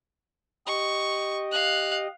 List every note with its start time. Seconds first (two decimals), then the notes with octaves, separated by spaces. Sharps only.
0.66 G4 D#5 C#6
1.51 F5 F#6